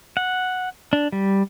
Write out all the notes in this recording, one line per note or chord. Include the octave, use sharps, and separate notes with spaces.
F#5
D4
G3